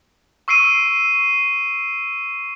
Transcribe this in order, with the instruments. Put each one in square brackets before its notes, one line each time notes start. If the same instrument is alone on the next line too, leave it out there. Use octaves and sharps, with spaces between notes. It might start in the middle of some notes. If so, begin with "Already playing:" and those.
[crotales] C#6 E6 C7 D7 D#7